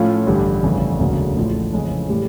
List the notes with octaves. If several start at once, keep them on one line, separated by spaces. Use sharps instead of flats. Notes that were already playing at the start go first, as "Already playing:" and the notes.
Already playing: A2 F3 A3 C#4 F4
A1 G2 D3 G3
G1 F2 C#3 E3 A3
E1 D2 C#3 F#3 A#3
A1 A2 F3
F2 C#3 E3 G#3 C#4
A2 E3 G3